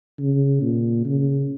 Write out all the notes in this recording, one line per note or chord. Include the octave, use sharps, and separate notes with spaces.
C#3
A#2
C#3